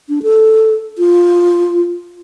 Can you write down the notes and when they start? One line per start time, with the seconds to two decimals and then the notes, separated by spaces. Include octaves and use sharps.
0.09 D4
0.23 A4
0.98 F4